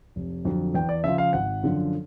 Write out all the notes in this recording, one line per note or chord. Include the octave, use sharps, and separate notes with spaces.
F1
F2 D3 F#3
E2 G5
D5
C#3 F3 E5
F5
G#1 F#5
F#2 D3 F3